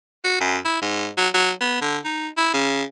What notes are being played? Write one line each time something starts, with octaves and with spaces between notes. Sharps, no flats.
F#4
F#2
E4
G#2
F#3
F#3
B3
D3
D#4
E4
C#3